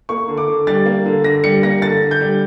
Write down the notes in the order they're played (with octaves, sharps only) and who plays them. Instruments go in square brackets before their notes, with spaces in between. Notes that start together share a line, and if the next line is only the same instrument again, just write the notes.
[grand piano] A#3 C#6
D3
D6
D3
G3 A6
A#3
D3
D3 A#6
G3 C#7
A#3 A#6
D3 A6
D3
G6
G3